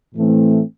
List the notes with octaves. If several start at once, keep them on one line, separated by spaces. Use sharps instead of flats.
A2 E3 A3 C4